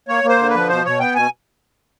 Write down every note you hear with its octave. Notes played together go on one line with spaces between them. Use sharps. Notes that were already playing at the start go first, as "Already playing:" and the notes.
A#3 C#5
A#3
C5
D3
B4
F3
B2 C5
B2 C#5
B3 G5
B2 G#5